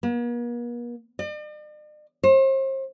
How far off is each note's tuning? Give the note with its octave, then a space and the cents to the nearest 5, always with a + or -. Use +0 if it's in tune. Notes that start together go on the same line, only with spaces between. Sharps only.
A#3 +45
D5 +45
C5 +40